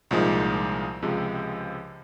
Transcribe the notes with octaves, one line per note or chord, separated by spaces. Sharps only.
C2 A#2 F3 G#3 D#4
C#2 C3 F3 G#3